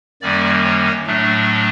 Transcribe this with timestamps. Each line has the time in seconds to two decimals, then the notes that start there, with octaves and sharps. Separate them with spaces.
0.22 F#2 D#3 G3 A#3 C#4 D5
0.64 C#5
1.06 A2 F#3 A3 D4